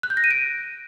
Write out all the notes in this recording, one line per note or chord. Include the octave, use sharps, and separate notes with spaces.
F#6
G6
A#6
D#7
D7